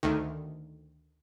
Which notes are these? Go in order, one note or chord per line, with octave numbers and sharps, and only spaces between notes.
D2 D#3